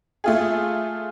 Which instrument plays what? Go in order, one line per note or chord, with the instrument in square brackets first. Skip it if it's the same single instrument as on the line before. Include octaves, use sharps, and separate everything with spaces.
[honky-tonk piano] A3 F4 G#4